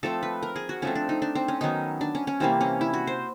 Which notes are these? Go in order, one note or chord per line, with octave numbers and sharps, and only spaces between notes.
F3 A3 C4 A4
B4
A#4
G#4
F#4
F3 A3 C4 C#4
D4
D#4
D4
C4
C#4
D#3 F#3 B3 D#4
D4
C#4
C#4
C3 E3 G3 A#3 C4
C#4
E4
F#4
C5